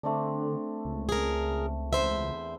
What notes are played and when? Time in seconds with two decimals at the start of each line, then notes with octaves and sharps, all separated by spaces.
0.03 D3 A3 C4 D4
0.85 C#2
1.09 G#4 A#4
1.93 E2 C5 E5